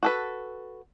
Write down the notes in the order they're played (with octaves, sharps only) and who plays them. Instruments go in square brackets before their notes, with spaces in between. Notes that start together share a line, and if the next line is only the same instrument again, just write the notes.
[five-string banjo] F#4 A4 B4